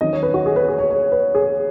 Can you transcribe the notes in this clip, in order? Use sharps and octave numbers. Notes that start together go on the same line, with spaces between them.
D#3 F#3 C#4 D#5
C#5
B4
F#4
G#4
B4
G#4
C#5
C#5
B4
G#4